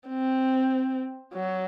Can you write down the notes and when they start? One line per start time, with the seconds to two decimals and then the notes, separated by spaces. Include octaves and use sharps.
0.08 C4
1.34 F#3